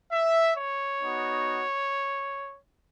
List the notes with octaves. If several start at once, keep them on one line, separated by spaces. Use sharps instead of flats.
E5
C#5
B3 D#4 F#4